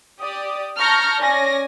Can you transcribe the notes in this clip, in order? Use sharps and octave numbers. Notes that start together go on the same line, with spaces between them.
G4 D5 D#6
A5 A#5 C#6 F6 G6 A#6
C#4 D5 G#5 A#6